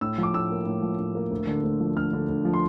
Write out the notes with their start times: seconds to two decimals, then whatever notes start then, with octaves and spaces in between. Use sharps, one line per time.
0.01 A2 E6
0.18 F3
0.23 D6
0.34 A2 E6
0.50 A#3
0.66 A2
0.82 F3
0.99 A2
1.15 A#3
1.31 D2
1.47 D3
1.64 D2
1.80 F3
1.96 D2 F6
2.13 D3
2.29 D2
2.45 F3
2.53 C6